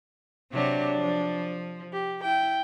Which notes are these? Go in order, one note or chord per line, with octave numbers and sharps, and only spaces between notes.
C3 F#3 D4 G4
F3
G4
E4 G5